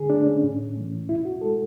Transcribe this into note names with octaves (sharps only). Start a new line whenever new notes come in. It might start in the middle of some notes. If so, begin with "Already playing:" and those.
Already playing: D3 G#4
A3 D4
C#4
A2
E3 A3
B2 E4
F#4
G#3 A4